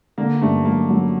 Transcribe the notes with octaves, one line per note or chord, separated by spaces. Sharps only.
D3 A#3
G2 A3
F#3 A#3
F#3